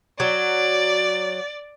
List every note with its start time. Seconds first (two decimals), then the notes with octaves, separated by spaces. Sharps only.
0.20 F#3 D5